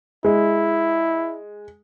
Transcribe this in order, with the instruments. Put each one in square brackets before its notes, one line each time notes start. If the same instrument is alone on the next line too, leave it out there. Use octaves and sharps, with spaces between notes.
[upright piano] G#3 [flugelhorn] E4